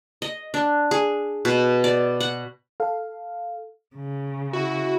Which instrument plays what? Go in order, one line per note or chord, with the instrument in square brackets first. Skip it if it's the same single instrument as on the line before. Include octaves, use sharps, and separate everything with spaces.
[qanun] D#5
D4
G#4
B2
D5
F#5
[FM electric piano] A4 F5
[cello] C#3
[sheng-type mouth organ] E4 [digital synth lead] F#4